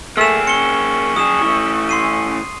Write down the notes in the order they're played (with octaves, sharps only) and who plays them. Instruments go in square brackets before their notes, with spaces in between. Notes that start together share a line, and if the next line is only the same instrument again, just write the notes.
[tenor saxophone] A3 [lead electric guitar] A#3 G#4 [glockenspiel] E6 E7
[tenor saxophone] C#4 [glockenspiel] C#7 G7
[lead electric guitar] F#3 G#4 [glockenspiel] D#6 E7
[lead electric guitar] E3 A3 [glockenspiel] C#6
[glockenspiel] C6 C7 D#7